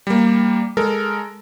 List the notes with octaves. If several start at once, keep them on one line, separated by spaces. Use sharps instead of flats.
G3 A#3
G#3 A4 A#4